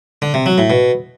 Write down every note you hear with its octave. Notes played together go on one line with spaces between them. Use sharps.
D3
C3
F#3
A2
B2